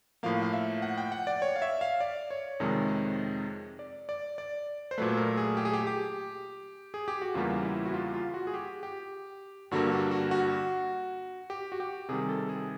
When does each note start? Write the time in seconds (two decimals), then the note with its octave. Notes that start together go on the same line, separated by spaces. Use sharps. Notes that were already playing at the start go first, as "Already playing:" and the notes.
0.23 A2 F3 A#3 F5
0.42 F5
0.53 E5
0.82 F#5
0.98 G5
1.12 F#5
1.27 D5
1.42 C#5
1.56 F5
1.62 E5
1.81 F5
2.00 D5
2.31 C#5
2.60 F2 C3 D#3 G#3
3.79 D5
4.09 D5
4.38 D5
4.91 C5
4.98 A#2 F#3 A3 B4
5.17 A#4
5.37 G#4
5.57 G4
5.65 G#4
5.73 G4
5.87 G4
6.94 G#4
7.08 G4
7.22 F#4
7.34 E2 C#3 E3 G3 A#3 F4
7.65 E4
7.85 F#4
7.94 F4
8.14 F4
8.34 F#4
8.47 G#4
8.54 G4
8.83 G4
9.71 G2 D3 G3 A#3 F#4
9.92 F#4
10.11 F#4
10.31 F#4
11.50 G4
11.72 F#4
11.80 G4
12.09 C3 D#3 G3 G#4
12.29 A4
12.49 G#4